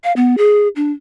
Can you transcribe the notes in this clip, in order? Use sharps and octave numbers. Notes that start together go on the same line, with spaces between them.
F5
B3
G#4
D4